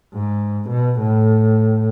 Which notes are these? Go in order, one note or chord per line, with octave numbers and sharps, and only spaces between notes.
G#2
B2
A2